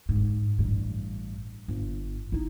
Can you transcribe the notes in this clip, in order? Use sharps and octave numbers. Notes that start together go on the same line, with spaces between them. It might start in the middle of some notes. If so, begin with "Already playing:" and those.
G#2
A1 G2
G1
D#4 E4